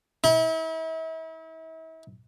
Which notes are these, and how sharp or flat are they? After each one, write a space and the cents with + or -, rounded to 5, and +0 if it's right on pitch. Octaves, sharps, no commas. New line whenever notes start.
E4 -40